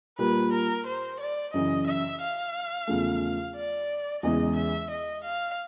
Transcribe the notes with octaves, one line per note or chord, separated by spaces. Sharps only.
A#2 G3 A#3 B4
A#4
C5
D5
F#2 C#3 E3 D#5
E5
F5
E2 C#3 F3 A3
D5
E2 C#3 E3 G#3 D#5
E5
D#5
F5